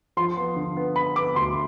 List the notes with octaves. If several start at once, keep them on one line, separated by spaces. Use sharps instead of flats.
F3 C6
B3
D3
B3
B3 B5
B3 D6
D2 C6